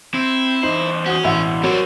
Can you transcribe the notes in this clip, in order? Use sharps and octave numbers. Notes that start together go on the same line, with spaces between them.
C4 E4
E2 D#4 C5 F#7
C#4 F#4 D#6
A1 B2 E4 E5 F#5
F#3 G3 A#4 C5 C#5